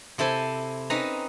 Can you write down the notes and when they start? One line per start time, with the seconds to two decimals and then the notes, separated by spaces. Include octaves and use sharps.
0.18 C3 E4 A4 C5 G#5
0.90 C4 C#4 D#4 B4 A#5